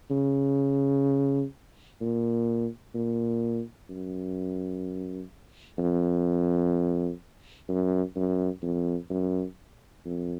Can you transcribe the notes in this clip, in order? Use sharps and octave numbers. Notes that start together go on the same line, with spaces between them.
C#3
A#2
A#2
F#2
F2
F#2
F#2
F2
F#2
F2